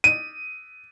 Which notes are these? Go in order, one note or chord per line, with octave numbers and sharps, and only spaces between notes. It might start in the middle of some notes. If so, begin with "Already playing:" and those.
D#7